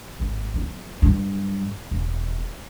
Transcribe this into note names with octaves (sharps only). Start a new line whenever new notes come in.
G#1
F#3 B3
G2 F#3
E1